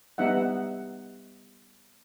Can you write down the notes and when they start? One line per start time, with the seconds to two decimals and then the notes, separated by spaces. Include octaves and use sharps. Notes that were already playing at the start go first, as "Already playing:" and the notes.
0.18 G3 B3 D#4 E5 F#5